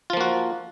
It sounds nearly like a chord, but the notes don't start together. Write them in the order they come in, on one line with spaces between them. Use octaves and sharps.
F4 F3 A#3 F#4